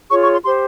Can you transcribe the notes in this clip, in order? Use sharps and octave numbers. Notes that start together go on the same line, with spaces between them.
F4 G#4 C#5 C#6
C#6
C6
G4 C5 C6